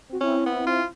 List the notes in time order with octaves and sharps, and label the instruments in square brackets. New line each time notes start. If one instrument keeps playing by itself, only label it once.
[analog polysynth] C4 F#4
[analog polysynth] C4 E4 [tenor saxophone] C#4
[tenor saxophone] B3
F4